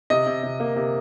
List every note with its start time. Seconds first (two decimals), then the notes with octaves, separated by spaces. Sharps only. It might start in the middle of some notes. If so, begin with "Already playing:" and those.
0.10 C3 D#5
0.27 C3
0.43 C3
0.60 A#3
0.76 C3